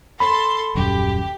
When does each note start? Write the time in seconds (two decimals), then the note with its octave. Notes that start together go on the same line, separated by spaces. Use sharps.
0.20 A4 B5 C6
0.75 D#1 F#2 G4